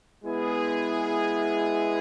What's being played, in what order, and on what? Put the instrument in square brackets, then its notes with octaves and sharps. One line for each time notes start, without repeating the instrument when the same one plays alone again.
[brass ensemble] G#3 B3 E4 G#4